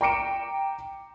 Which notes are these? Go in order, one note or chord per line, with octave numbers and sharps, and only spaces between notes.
G5 A#5 D6 C#7 D7 E7